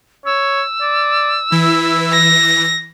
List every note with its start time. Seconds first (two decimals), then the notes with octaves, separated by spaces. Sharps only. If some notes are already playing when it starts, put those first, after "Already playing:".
0.26 C#5 E6
0.81 D5
1.52 E3 E4
2.12 A#6